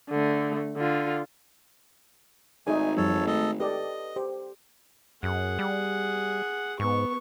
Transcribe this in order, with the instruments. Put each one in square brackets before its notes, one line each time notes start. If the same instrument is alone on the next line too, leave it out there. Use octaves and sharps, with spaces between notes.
[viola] D3 A3
D3 F4
[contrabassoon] G#1 [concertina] A3 G#5 [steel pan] D#4 G#4 [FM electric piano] D5
[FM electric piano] F#2 F3 G3 [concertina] A4 C#5
[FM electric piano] A3 [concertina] A4 D#5
[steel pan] G4 A4 D5 [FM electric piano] B4 [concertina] D#5
[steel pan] G4 [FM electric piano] C5
[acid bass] F#2 [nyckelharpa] G#4 F#5
[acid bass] G3
[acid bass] G#2 [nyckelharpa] B3 C#6